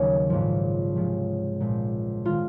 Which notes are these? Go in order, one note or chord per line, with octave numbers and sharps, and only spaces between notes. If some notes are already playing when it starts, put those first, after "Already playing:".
Already playing: D#2 C#3 F#3 C#4
A#1 G#2 F3
C#2 C3 F3 G#3
A#1 A#2 G#3
D#3 G#3 F4